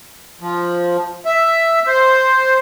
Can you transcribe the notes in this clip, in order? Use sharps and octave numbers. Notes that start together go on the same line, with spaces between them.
F3
E5
C5